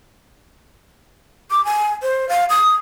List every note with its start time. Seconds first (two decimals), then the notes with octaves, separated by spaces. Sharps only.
1.51 D6
1.65 G#5
2.02 C5
2.29 F5
2.50 D#6